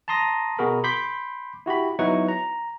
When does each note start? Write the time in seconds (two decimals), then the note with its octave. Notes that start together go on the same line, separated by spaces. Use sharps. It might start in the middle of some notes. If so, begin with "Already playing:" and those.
0.08 A5 A#5 C6 D#6 A#6
0.58 B2 F#4 G#4 A#4 B5
0.84 B5 C6 D6 G6 B6
1.66 E4 F#4 G4 B5
1.99 F#3 B3 D#4 E4 B4 C#6
2.28 A#5